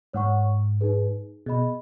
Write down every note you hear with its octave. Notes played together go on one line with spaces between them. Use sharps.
G#2 C#5 F#5 C#6
D#4 G#4 B4
B2 G#4 D#5 B5